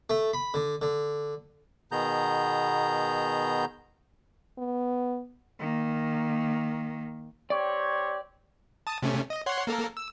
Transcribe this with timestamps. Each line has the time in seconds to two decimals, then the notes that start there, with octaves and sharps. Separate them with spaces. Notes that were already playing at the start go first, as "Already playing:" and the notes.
0.10 A3
0.33 B5
0.54 D3
0.82 D3
1.92 B2 D#3 B3 G#4 A#5 G6
4.58 B3
5.59 D#3 A#3
7.50 C4 G4 C#5 D5
8.87 A5 D#6
9.02 C3 A3 C#4
9.30 D#5
9.46 C#5 F#5 C6
9.67 A#3 A4 A#4
9.97 E6